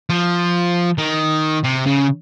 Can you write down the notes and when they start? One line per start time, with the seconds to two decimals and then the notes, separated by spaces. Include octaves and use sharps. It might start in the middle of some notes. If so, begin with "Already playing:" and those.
0.10 F3
0.98 D#3
1.64 C3
1.86 C#3